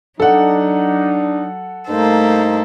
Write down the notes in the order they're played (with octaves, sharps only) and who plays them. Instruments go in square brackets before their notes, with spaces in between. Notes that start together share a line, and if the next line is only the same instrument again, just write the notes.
[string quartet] F#3 [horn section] D4 D#4 [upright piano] A4 F#5
[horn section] G2 D#4 C5 [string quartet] A3 A#3 A4